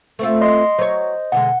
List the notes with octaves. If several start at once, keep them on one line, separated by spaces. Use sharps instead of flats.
A3 C4 F4
D#5 C6
F#3 C5 C#5 D#5
B2 D3 G#3 F#5